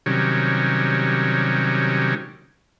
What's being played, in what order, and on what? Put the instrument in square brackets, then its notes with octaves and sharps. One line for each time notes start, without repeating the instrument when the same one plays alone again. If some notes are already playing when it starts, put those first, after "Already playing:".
[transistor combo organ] C3 D#3 F#3 G3 C#4